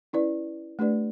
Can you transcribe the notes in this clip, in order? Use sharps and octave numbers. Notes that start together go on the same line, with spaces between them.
C#4 E4 B4 D5
A3 D4 G4 B4 D5